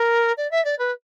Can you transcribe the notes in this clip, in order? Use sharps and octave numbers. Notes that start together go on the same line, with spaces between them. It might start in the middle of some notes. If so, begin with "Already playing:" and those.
Already playing: A#4
D5
E5
D5
B4